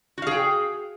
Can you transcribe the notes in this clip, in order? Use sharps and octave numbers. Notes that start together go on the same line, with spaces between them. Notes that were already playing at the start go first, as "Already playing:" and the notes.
F#4 G#4 F5 G5